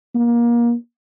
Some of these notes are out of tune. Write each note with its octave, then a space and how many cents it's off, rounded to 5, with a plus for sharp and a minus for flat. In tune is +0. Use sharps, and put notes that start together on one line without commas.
A#3 +25